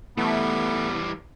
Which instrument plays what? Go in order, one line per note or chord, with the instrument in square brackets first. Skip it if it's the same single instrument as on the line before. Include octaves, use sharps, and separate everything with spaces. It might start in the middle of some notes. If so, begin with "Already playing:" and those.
[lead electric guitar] E3 G3 [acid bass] A3 [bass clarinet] B3